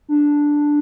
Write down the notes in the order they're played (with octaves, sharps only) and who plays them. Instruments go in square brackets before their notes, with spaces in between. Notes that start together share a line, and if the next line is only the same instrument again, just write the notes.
[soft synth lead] D4